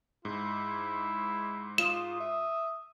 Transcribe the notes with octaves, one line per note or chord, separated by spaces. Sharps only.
G#2 E4
F4 D#6 E7
E5